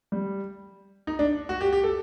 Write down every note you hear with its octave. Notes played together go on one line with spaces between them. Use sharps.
G3
D#4
D4
F#4
G4
G4
A4